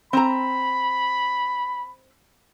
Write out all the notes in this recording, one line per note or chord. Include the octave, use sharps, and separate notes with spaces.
C4 A#5 B5